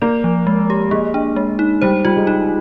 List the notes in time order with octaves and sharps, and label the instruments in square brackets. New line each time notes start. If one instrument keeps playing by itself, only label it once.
[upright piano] A#3 [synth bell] D5
[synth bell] F3
G#3
G4
[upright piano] G#3 [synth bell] A#3
[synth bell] D4
G#3
D#4
[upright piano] G3 [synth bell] C5
[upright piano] G3 [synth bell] F4
[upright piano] G#3
[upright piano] G3 [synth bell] D#4